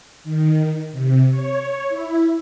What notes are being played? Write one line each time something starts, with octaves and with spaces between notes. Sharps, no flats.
D#3
C3
C#5
E4